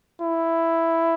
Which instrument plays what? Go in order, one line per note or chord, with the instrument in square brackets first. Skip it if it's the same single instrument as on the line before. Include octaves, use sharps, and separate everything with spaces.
[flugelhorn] E4